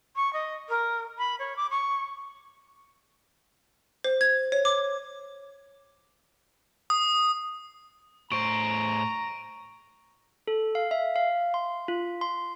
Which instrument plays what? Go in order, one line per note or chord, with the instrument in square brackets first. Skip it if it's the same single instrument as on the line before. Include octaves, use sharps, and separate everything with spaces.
[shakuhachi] C#6
D#5
A#4
B5
C#5
D6
C#6
[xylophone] C5
G#6
C#5
D6
[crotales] D#6
[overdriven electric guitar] A2 C5 [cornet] A#5 [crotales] C#6 D7
[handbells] A4
F5
E5
F5
C6
F4
C6